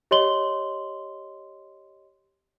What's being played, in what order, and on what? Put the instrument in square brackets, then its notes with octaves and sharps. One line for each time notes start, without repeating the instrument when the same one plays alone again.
[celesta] G4 C#5 D#5 C6 F#7 G7